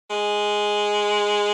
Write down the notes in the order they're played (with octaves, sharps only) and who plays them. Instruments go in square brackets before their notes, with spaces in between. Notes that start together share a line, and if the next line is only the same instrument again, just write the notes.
[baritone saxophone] G#3